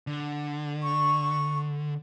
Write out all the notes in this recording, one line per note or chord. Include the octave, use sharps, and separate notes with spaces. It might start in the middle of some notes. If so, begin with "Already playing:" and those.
D3
C#6